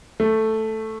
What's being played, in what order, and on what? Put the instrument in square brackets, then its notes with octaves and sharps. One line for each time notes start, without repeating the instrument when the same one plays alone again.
[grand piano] A3